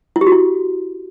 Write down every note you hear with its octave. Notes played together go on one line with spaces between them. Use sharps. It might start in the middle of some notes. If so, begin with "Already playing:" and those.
E4
G4
F#4
E4